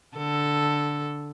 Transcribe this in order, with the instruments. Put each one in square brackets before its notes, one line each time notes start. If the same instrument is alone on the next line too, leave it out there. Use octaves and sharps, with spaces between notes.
[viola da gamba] D3 A4